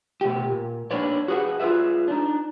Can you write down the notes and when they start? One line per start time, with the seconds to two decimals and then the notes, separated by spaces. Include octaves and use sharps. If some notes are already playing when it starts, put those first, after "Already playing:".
0.21 B2 A3 G4
0.45 A#2
0.91 A#3 D4 D#4 B4 C#5 D5
1.28 F#4 G#4 B4 F#5
1.60 F4 G#4 A4 B4 E5
2.08 D4 D#4